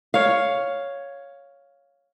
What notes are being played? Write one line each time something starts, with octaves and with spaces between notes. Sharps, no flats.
C#5 F5